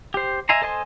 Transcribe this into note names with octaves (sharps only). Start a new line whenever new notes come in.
G4 C5
D#5 E5 G#5 A#5 C6
A4 C5 D#5 G#5 C6